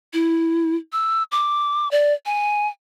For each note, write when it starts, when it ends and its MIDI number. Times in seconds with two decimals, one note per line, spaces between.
0.13 0.75 64
0.93 1.23 88
1.32 1.91 86
1.91 2.13 74
2.26 2.68 80